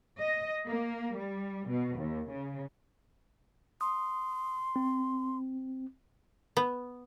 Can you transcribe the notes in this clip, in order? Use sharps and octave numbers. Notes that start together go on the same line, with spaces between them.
D#5
A#3
G3
B2
D#2
C#3
C6 D#6
C4
B3